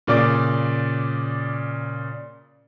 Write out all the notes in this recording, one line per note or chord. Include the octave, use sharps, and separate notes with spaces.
A#2 C#3 D5 D6